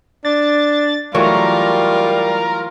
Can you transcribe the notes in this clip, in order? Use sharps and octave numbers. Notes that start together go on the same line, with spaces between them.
D4 A6
E3 F#3 G3 A3 F4 A#4